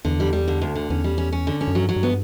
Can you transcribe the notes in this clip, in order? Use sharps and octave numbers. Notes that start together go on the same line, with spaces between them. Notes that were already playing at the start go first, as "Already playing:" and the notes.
E2 D3
G3
G3
D3
D2
D3
E2 C#4
G3
C#4
C#4
D3
C#4
F#2
G2 F#3
F#3
G2
B3